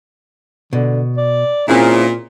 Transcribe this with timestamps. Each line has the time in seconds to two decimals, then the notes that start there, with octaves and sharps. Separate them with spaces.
0.73 B2 D3
1.17 D5
1.68 A#2 C4 C#4 E4 G#4